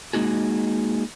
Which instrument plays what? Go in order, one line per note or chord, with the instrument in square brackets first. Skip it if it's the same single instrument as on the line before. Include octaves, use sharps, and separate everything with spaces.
[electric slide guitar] G#3 A#3 D#4 F#4 G#4